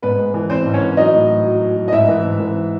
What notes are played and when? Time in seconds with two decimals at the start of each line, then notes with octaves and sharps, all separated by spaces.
0.02 G#2 B3 B4
0.19 G#3
0.34 E3
0.50 E3 C4 C5
0.66 G#2
0.74 C#4 C#5
0.82 E3
0.97 F#3 D#4 D#5
1.14 A2
1.30 F#3
1.45 F#3
1.62 F#3
1.77 F#3
1.88 D#5
1.92 G#2 E4 E5
2.08 E3
2.25 G#2
2.40 E3